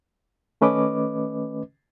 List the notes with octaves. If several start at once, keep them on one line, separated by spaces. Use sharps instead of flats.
D#3 A3 C#4 B4 D#5 D6